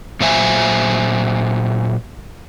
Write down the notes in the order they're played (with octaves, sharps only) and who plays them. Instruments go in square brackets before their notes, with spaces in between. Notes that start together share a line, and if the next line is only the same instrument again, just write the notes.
[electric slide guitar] A#2 F#3 C5 E5 G#5